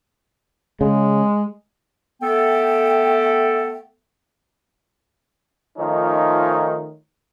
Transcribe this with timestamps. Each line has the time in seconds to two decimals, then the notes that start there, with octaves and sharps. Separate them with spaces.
0.81 C#3 G#3
2.22 A3 B3 A4 G5
5.78 D#3 F3 A3 C#4 D#4 F4